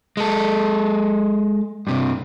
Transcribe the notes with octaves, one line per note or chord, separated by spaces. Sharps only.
G#3 A4
G2 C3